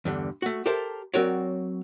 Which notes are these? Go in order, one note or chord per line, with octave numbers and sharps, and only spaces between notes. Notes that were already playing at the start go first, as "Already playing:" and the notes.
E2 G2 D3
A3 F#4
G4 A4 A#4 C5 E5 A5
F#3 C4 F#4 A#4 C#5 D5